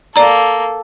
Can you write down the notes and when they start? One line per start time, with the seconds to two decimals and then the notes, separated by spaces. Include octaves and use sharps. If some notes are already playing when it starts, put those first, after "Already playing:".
0.16 A#3 A4 D5 A#5